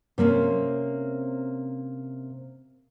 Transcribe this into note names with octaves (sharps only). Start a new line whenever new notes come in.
C3 A#3 C4 C#4